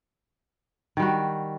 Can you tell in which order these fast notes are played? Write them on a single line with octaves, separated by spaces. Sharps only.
D#3 G3 F#4